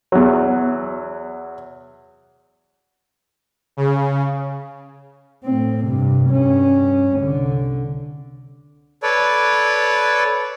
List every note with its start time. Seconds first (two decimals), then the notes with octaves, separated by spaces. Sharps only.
0.12 E2 F#3
3.77 C#3
5.44 A2 C4
5.85 G2 C3
6.29 G2 C#4
7.17 C2 D3
9.03 A4 B4 C#5 D5